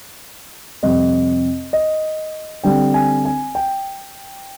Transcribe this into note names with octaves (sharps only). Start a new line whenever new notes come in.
F2 C3 G3 C4 D#5
D#5
D3 G3 C4 G5
G#5
G#5
G5